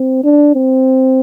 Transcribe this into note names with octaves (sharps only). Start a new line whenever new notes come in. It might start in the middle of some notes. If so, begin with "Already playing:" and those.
Already playing: C4
D4
C4